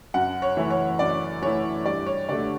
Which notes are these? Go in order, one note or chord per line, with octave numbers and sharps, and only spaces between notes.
F#2 F#5
C#5
E3 A3 E4
C#5
F#2 D5
E3 A3 E4 C#5
G2 D5
C#5
D3 A3 D5